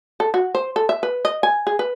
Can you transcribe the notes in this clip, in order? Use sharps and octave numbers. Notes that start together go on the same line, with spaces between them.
A4
F#4
C5
A4
E5
B4
D#5
G#5
G#4
B4